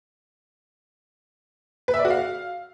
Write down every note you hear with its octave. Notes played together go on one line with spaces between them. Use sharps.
B4
E5
D5
F#4
F5